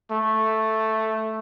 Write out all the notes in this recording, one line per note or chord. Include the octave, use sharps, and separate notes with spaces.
A3